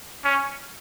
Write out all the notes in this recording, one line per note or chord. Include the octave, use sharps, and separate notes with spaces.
C#4